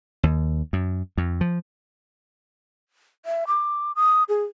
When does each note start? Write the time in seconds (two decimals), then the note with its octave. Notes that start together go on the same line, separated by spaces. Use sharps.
0.23 D#2
0.73 F#2
1.18 F2
1.41 F3
3.26 E5
3.47 D6
3.96 D#6
4.29 G#4